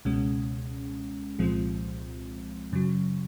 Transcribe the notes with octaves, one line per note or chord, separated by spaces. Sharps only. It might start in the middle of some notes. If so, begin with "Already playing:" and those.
C#2 B2 G#3 C#4
C2 A#2 F3 G#3 C4
F#2 C#3 F#3